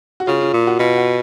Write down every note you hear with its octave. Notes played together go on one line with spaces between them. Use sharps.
F#4
C#3 F4
F4
A#2
F#4
B2 F4
F#4